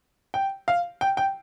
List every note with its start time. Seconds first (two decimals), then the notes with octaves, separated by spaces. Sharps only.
0.34 G5
0.68 F5
1.01 G5
1.17 G5